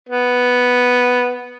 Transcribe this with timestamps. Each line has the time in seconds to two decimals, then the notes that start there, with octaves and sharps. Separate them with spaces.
0.09 B3